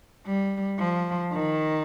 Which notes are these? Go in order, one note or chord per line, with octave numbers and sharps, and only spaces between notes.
G3
F3
D#3